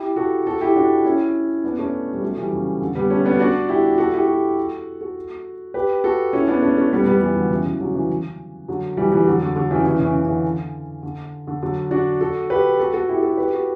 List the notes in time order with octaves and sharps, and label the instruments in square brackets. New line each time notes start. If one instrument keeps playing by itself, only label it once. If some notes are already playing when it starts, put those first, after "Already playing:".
Already playing: [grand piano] E4 G4
F#4 A4
F#4 A4
E4 G4
D4 F#4
C#4 E4
B3 D4
A3 C#4
G3
F#3 A3
E3 G3
C#3
D3
G3 B3
A3 C#4
B3 D4
D4 F#4
E4 G4
F#4 A4
E4 G4
F#4 A4
F#4 A4
G4 B4
F#4 A4
C#4 E4
B3 D4
A3 C#4
A3 C#4
G3 B3
G3 B3
E3 G3
D3 F#3
C#3 E3
F#3
C#3 E3
D3 F#3
C#3 E3
D3 F#3
E3 G3
E3 G3
D3 F#3
D3
D3 F#3
C#3 E3
C#3 E3
C#3 E3
C#3
E3
D3
D3
D3
D3 F#3
D4 F#4
F#4 A4
G4 B4
F#4 A4
F#4 A4
E4 G4
F#4 A4
G4 B4
F#4 A4